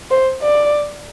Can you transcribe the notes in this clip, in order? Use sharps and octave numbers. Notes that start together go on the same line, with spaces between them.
C5
D5